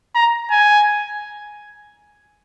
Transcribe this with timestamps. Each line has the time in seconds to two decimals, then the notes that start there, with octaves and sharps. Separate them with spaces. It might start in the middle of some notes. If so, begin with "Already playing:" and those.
0.15 A#5
0.50 G#5